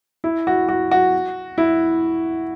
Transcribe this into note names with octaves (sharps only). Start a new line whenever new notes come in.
E4
F#4
F#4
F#4
E4